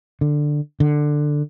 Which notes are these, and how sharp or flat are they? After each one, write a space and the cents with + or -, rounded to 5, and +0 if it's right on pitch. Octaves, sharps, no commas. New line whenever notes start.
D3 +10
D3 +15